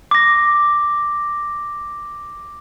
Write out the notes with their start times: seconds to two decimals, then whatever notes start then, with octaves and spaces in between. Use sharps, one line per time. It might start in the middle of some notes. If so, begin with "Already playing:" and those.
0.11 D6 A#6